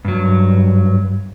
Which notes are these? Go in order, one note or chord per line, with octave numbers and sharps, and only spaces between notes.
G2 F#3